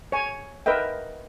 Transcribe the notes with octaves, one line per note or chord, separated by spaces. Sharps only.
C#5 G#5
A#4 B4 D#5 E5 G5